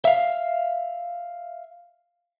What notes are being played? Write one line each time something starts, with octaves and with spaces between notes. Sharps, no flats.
E5 F5